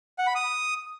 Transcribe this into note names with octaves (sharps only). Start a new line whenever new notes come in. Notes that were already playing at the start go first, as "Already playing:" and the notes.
F#5
B5
D#6